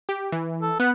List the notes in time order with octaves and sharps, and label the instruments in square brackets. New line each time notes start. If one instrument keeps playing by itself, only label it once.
[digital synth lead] G4
E3
[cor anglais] A4
[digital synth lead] B3 [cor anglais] F#5